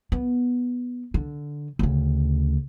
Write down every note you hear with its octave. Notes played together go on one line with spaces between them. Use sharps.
B3
D3
D2 C#3